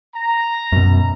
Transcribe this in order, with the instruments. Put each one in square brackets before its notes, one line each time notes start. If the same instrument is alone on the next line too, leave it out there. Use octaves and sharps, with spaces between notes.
[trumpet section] A#5
[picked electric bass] F#2 B2